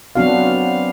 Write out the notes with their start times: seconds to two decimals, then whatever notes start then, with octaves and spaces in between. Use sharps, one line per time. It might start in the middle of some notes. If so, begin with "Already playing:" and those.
0.15 F#3 B3 C4 D4 F#4 F5